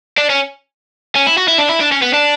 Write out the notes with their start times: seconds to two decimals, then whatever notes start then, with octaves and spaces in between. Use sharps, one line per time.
0.18 D4
0.29 C#4
1.16 C#4
1.27 E4
1.38 F#4
1.48 E4
1.59 D4
1.69 E4
1.81 D4
1.92 C#4
2.02 B3
2.14 D4